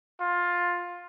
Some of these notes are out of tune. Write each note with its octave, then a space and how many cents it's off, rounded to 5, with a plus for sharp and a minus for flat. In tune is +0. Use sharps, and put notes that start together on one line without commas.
F4 +15